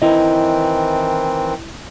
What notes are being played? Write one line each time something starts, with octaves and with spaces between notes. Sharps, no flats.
D#3 E3 C4 E4 D#5